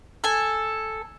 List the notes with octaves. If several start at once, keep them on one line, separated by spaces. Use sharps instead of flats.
A4 G#5